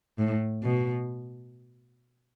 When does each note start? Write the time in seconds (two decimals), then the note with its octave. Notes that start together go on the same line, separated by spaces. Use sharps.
0.18 A2
0.63 B2